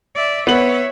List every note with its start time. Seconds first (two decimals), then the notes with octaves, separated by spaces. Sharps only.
0.15 D5 E5
0.47 B3 C#5 E5 F#7